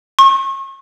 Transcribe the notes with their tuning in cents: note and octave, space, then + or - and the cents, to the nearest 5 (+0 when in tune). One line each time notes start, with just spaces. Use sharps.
C#6 -40